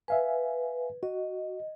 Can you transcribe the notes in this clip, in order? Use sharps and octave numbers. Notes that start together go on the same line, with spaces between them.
B4 E5 F5 G#5
F#4 D#5